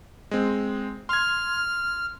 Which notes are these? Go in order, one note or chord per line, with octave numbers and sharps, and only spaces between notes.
G#3 C4
C6 F6 G#6